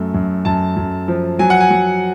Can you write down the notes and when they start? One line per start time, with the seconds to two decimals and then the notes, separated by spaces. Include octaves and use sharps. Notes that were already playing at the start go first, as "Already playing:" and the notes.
Already playing: F#2 A3
0.14 F#2
0.45 F#2 A5
0.76 F#2
1.08 F3
1.39 F#3 G#5
1.50 F#5
1.60 G#5
1.70 F#3